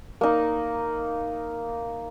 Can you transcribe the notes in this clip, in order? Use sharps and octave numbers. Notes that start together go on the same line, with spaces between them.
A#3 D#4